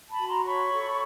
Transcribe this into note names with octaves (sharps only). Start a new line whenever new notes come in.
A5 B5
F#4
A#5 C6
C#5 B5 C#6
A4